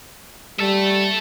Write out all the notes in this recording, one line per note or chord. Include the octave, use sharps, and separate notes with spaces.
G3 A4 E5